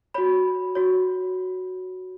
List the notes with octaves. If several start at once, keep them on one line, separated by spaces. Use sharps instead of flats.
F#4 C#5 B5
F#4 C#5